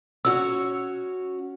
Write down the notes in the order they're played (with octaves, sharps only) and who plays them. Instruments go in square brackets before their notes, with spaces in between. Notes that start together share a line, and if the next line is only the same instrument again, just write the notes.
[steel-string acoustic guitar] C#4 F#4 C#5 [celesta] E6